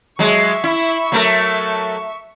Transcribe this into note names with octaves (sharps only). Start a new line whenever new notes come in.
F#3 G#3 E5 C#6
E4
F#3 A3 A#4